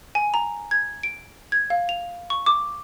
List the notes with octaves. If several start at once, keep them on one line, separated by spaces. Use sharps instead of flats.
G#5
A#5
G#6
D7
G#6
F5
F7
C#6
D6